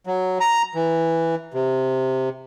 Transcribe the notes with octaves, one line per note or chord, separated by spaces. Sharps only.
F#3
A#5
E3
C3